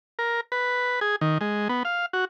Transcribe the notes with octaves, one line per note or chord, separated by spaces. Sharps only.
A#4
B4
G#4
D#3
G#3
B3
F5
F#4